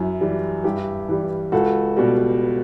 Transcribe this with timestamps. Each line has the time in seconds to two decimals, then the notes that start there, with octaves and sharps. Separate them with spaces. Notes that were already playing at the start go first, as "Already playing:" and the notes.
Already playing: F#2 E4
0.21 E3 G3
0.64 G2 E4 G4
1.09 E3 G3
1.52 C#2 F#4 A4
1.97 B2 G3